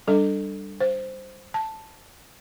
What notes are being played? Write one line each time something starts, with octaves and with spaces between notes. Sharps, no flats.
G3 D4 A4
C5
A5